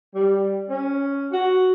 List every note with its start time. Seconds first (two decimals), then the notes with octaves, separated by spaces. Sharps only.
0.14 G3
0.69 C#4
1.32 F#4